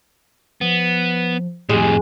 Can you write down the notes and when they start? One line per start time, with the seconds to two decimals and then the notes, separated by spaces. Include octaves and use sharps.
0.61 F3 B3
1.69 F2 A2 G#3 G4